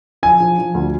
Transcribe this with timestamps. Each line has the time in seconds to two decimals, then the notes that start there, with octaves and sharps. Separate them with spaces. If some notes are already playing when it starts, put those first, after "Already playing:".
0.23 F3 G#5
0.40 F3
0.58 F3
0.75 D2